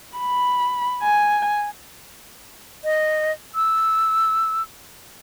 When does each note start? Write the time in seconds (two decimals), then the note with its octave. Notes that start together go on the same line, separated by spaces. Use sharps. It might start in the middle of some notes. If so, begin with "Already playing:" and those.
0.18 B5
1.03 G#5
2.84 D#5
3.55 E6